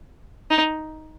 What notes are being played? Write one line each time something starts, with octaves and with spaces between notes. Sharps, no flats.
D#4